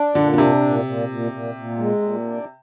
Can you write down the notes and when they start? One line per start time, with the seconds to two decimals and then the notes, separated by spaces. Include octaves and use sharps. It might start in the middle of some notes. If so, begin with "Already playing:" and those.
Already playing: D4
0.15 A#2 D3
0.33 D3
0.38 C3 D4
0.62 A#2
0.85 A#2
1.09 A#2
1.32 A#2
1.55 A#2
1.79 G#3
2.02 A#2
2.25 D4